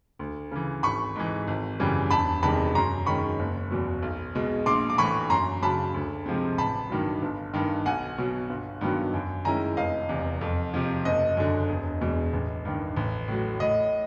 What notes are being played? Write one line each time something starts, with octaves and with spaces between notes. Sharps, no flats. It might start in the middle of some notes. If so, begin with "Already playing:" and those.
D2
C#3 E3
G#1 B5 C#6
G#2 E3
G#1
F#2 C#3 E3 G3
E1 A5 B5
E2 C3 D#3 G#3 A5 B5
F#2 A#5 C6
D#3 G#3 C#4 B5 C#6
F#1
E2 B2 F#3
B1
B2 G#3
A#1 C6 D6
D6
A2 E3 B5 C#6
F#2 A#5 C6
C#3 F#3 A5 B5
D2
C3 F3 G#3 C4
A1 A5 B5
G2 D#3 F#3
G1
G2 D#3
B1 F#5 G#5
B2 F#3
G1
G2 D#3 F#3 B3
F#2
D#3 G#3 C#4 E4 G#5 A#5
F1 D#5 F5
E2 C3
F2
C3 F3
F#1 D#5
F#2 D3
E1
E2 B2 G#3
A1
G2 D#3
A1
A2 F#3
A2 D#5